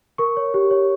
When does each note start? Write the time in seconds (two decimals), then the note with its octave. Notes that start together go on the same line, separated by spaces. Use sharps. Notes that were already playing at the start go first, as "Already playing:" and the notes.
0.18 A#4 C#6
0.37 C#5
0.54 G4
0.71 C#5